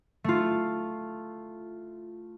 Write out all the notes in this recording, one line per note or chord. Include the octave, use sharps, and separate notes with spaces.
A3 F4